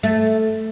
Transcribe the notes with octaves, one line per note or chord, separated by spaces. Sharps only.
A3